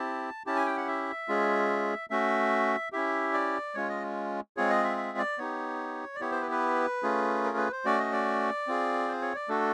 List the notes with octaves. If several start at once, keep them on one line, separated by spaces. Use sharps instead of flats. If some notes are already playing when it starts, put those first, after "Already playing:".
Already playing: C4 E4 G4 A5
C#4 E4 G4 A5
G#5
G5
F#5
E5
G#3 C#4 F4 G#4
A3 C#4 F#4 E5
C#4 E4 G4 E5
D5
G#3 C#4 F4 C#5
D#5
G#3 C4 F4 G#4 C#5
D#5
E5
E5
D5
B3 D#4 G4 C#5
D5
B3 E4 G4 C#5
C5
B4
B4
A3 C#4 F4 G#4
A#4
B4
C5
A3 C#4 F#4 D5
D#5
D5
C4 F4 G#4
C5
C#5
D5
A3 D4 F#4 A4